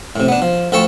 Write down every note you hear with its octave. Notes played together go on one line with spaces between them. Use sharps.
A2 C3
B3 D4
F3
D2 F3 A4 G5 A5 C#6